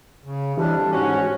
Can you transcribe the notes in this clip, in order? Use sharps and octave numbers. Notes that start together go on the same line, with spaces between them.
C#3
F2 E3 G3 D4 G4
G#2 C#4 F#4